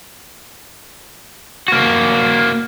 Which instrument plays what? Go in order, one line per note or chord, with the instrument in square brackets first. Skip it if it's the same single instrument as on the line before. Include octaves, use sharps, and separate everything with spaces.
[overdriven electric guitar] A#3 F#4